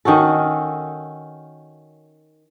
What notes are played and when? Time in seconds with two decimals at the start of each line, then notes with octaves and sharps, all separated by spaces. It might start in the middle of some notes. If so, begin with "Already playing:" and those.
0.05 D#3 C#4 F#4 A4